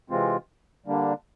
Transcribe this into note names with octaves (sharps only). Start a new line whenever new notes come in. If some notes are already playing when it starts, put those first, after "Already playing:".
C3 E3 G#3 C4 F4
D3 G3 A#3 D4